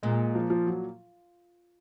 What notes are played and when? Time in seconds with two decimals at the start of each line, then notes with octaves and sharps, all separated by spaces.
0.03 A#2 G#3
0.35 F3
0.50 F3
0.67 F#3